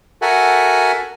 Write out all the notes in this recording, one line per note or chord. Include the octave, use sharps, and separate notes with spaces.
F#4 A4 A#4 E5 F#5 G#5